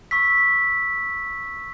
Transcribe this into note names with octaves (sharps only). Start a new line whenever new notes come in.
C#6 E6 B6